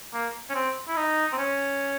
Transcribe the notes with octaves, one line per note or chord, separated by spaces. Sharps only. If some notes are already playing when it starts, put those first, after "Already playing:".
A#3
C#4
C4
E4
D#4
C4
C#4